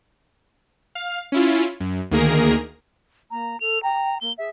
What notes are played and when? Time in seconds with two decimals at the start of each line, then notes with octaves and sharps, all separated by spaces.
0.95 F5
1.32 C#4 E4 F4
1.80 F#2
2.11 D2 D#3 A#3 G#4 A#4 A#6
3.31 A#3 A#5
3.60 A4 F7
3.83 G5 A#5
4.21 A#3 G7
4.38 G#4 E5